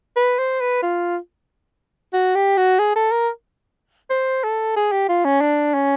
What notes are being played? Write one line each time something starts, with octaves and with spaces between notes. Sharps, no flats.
B4
C5
B4
F4
F#4
G4
F#4
G#4
A4
A#4
C5
A4
G#4
G4
F4
C#4
D4
C#4